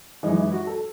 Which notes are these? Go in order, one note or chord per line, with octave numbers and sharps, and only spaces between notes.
F#2 E3 G#3 D#4
E4
F#4
A4